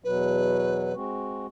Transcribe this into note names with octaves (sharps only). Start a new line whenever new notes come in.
E2 B2 F#3 B4
G#3 C4 F#4